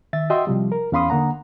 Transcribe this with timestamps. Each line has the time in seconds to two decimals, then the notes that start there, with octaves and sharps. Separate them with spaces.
0.13 D#3 E5 A6
0.30 F#4 D#5 E5 G5 C6
0.47 C3 F3 G3
0.72 A#4
0.92 E2 C#4 F5 B5 C6 D#6
1.10 D3 A#3 F#5 A#5